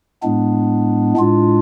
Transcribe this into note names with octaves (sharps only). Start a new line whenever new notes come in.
A2 G#3 B3 D4
A2 G#3 D4 F4